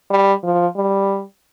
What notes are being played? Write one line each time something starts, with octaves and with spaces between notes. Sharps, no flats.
G3
F3
G3